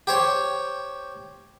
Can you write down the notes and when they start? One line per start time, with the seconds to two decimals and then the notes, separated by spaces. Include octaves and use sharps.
0.07 G4 C5 C#5